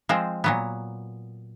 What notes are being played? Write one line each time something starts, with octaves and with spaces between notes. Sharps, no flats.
F3 G#3 C4
A#2 F#3 B3